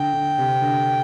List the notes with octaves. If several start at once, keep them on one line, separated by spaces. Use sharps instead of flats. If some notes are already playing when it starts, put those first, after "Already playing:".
Already playing: D3 G5
D3
C3
D3